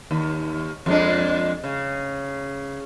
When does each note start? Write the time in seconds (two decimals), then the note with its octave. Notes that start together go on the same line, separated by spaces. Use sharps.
0.11 D#2
0.86 F2 G#3 D4
1.64 C#3